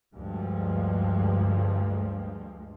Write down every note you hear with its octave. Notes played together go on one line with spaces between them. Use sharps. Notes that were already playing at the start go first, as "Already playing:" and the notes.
D2 G2 F3 G#3